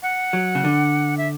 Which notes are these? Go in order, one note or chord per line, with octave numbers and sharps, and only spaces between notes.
F#5
F#3
C#3
D3
E5